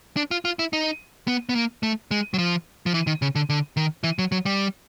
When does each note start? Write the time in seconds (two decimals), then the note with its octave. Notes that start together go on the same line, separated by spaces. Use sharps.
0.17 D4
0.31 F4
0.45 F4
0.59 E4
0.73 D#4
1.27 B3
1.49 B3
1.55 A#3
1.83 A3
2.11 G#3
2.34 F#3
2.38 F3
2.86 F3
2.94 E3
3.07 D#3
3.22 C#3
3.35 D3
3.49 D3
3.77 D#3
4.04 E3
4.19 F#3
4.32 F#3
4.46 G3